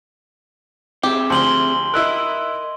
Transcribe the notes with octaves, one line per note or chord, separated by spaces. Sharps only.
C4 G4 G#4 E5
D2 F3 C6 F#7 G7
E4 A#4 D#5 E6 F#6